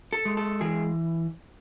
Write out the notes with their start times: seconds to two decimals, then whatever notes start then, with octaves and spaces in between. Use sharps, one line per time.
0.13 A4
0.25 G#3
0.37 A4
0.61 E3 G#4